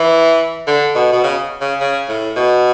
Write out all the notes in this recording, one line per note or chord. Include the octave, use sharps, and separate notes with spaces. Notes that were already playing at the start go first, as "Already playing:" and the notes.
Already playing: E3
D3
B2
B2
C#3
C#3
C#3
A2
B2